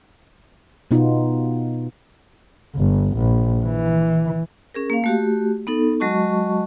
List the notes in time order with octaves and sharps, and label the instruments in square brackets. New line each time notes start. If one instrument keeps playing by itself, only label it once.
[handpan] B2 B3 D#4 F4
[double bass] G1
A#1
E3
[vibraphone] C#4 G#4 A#4
A#3 F5
A3 F#4 G4
B3 D#4 A4
F#3 G#3 F#4 D#5 A5 C#6